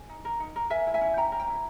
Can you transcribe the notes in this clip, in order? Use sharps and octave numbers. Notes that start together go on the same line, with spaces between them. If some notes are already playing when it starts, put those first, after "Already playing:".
Already playing: G#5
D#4
A#4
D#4
A#4
A#4 E5 G#5
E4
E5 G#5
C#4
C#4 G5 A#5
A#4
G5 A#5
E4